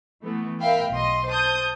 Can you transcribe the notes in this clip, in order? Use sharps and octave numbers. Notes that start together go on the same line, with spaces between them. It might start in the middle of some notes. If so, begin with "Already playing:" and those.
E3 A3 B3
A#4 E5 F5 G5 B5
B1 D#5 C6
C5 A5 D#6 G6